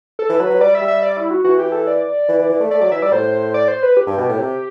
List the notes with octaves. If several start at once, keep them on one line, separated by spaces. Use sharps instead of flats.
A4
E3
F#3 B4
F#3
G3 D5
E5
G3
E5
D5
E4
F#4
E3 F#4
G4
A4
D5
E3
E3
E3
A3
A3 D5
F#3 D5
E3 E5
G3 D5
A2 C5
D5
C5
B4
G4
G2
B2
A2
C3